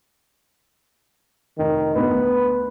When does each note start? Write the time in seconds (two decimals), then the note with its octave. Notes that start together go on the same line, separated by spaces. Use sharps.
1.58 F1 D#3
1.95 D2 B3 B4